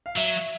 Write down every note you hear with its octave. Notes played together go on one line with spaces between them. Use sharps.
F5
F#3 E5